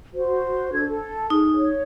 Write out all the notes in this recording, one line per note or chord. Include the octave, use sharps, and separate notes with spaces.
F#4 C5
D4 A4 G#6
A4
D#4 G#4
C#5